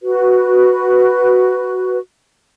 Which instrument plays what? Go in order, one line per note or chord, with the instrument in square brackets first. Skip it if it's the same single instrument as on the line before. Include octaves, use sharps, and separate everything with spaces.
[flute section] F#4 B4